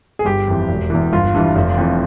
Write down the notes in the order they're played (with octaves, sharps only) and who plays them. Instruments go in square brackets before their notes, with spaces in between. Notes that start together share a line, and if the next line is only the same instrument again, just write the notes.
[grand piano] G#4
G1 G4
F2 E3
E1
E2 E3
G1 F4
G2 E3
F1
F2 E3